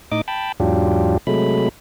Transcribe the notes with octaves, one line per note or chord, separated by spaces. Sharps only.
A2 D#4 D#5 D6
G5 A5 B5
E2 G#2 F#3 D4 F4 G4
C3 F#3 G#3 A3 B5